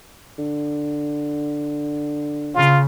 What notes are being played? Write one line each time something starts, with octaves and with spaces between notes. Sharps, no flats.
D3
C#3 F4